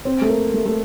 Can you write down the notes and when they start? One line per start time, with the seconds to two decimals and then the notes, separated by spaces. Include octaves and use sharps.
0.05 C4
0.21 A3
0.29 A#3
0.54 A3
0.66 A3